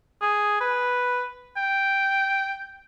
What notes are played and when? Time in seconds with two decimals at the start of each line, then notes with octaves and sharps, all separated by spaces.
0.21 G#4
0.61 B4
1.57 G5